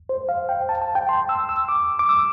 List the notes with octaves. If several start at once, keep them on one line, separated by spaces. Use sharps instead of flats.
C5
F5
G5
A5
A5
G5
C6
E6
E6
D6
D6
E6